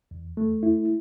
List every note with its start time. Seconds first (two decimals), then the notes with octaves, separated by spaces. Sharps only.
0.11 E2
0.37 A3
0.63 E4